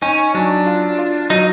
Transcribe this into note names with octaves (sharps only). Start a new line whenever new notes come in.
C#4 D#4
F#3 D4
F4
F4
F#3 D#4